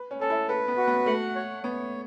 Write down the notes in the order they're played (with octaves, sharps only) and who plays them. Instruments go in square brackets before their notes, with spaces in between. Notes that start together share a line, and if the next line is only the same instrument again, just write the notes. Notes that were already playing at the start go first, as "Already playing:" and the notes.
Already playing: [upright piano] B4
C#4
[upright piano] C#4 [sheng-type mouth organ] A4
[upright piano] E4
[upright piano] A4 [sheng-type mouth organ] B4
[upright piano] B3
[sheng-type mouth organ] F#4
[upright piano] B3
[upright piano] A3 [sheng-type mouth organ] F#5
[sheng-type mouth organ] C#5
[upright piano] B3 [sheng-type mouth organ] C#5